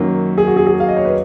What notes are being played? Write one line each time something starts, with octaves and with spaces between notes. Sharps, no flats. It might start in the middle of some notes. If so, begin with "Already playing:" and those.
Already playing: F#2 D#3 F#3 A#3 C#4
G#4
F#4
G#4
G#4
F5
D#5
C#5
B4